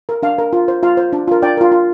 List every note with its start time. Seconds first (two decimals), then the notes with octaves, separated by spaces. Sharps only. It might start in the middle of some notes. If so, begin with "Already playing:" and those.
0.09 A#4
0.23 D4 F5
0.38 A#4
0.53 F4
0.68 C5
0.83 F4 F5
0.97 C5
1.13 D4
1.28 F4 A#4
1.42 D4 D5 G5
1.57 F4 A#4
1.72 F4